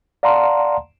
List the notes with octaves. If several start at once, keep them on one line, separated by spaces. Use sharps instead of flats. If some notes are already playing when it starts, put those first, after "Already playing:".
D5 F5 F#5 A5 A#5 C6